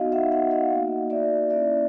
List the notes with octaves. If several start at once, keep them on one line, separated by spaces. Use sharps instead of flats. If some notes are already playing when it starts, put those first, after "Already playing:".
Already playing: B3 D#4 F#4 D#5 F5
E5 F#5
E5 F#5
D#5 F5
A#3 D#4 F#4
D5 E5
A#3 C#4 E4 D5 E5